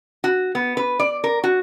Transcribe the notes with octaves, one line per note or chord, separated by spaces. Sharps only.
F#4
B3
B4
D5
A#4
F#4